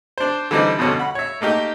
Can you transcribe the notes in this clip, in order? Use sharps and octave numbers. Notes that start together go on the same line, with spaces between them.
D4 C5
D3 E3 G3 C4 D#4
F2 B2 D3 C#4
F#5 B5
C#5 E5
A3 A#3 D#4 G4